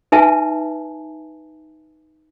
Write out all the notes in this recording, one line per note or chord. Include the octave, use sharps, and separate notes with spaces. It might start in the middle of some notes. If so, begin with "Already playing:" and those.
D#4 B4 E5 G#5 A5